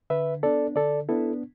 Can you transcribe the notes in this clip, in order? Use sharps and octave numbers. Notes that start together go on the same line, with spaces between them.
D3 B4 E5
B3 D4 A4 D5
D3 A4 D5
B3 D4 E4 A4